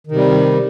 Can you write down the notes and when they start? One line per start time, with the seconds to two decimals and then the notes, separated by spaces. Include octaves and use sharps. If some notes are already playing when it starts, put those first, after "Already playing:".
0.07 D#3
0.11 C3
0.16 G3